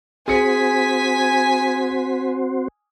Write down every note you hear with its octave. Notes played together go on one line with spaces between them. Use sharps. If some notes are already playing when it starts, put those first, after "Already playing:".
C4 F#4 G#4 C5 G#5 B6 C#7